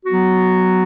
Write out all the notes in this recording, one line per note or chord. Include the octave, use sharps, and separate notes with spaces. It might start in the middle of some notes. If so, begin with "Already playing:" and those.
F#3 B3 F#4